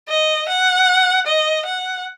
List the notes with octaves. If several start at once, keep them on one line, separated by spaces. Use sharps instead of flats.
D#5
F#5
D#5
F#5